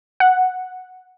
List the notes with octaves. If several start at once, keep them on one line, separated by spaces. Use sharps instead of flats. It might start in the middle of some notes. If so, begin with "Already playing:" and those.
F#5